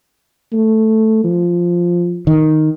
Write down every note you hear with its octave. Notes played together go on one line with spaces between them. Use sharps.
A3
F3
D#3